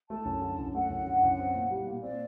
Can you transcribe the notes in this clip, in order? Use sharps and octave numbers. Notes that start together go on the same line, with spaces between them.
A3 A5
F#2
D3
F#2
A3 F#5
F#2
D3
F#2
C4
A#2
G3
A#2
C4 D5